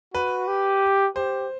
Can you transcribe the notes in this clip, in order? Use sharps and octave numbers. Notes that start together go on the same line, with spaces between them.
F#4 B4
G4
G4 C5